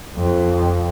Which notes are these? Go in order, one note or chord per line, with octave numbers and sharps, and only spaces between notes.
F2